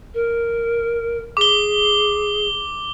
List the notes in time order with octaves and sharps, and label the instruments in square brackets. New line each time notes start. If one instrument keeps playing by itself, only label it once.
[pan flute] A#4
[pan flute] G#4 [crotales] D6 G7